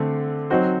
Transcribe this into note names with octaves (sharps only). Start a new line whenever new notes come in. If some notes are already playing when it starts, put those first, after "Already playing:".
Already playing: D3 A3 C4
F#3 C4 D#4 F#4 C5